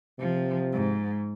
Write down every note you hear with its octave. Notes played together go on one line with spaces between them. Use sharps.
C3 F3
G#2